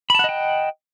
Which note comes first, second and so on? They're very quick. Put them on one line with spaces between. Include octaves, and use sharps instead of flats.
B5 A5 F#5 D#5 G5